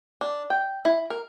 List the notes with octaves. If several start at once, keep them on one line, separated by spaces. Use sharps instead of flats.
D4
G5
E4
A#4